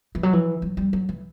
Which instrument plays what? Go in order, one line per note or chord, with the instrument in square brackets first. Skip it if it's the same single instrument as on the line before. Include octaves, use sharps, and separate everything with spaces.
[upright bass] E3
F#3
E3
F#3
G3
F#3
E3